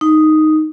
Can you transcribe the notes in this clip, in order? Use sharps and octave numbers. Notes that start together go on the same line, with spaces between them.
D#4